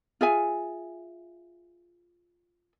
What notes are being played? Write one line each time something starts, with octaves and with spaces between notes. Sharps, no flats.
F4 G#4 E5 G#5